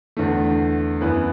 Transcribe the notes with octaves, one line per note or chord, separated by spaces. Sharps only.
E2 D3 A3
F#2 E3 B3 E4 B4